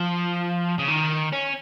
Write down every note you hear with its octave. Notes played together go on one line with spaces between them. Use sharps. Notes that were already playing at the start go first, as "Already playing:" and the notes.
Already playing: F3
C#3
D#3
C#4